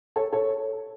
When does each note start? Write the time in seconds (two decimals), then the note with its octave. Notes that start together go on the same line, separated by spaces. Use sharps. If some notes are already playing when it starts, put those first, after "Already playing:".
0.16 A4 C#5
0.32 A4 C#5